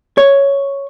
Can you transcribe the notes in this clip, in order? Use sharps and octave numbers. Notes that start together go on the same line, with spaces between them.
C#5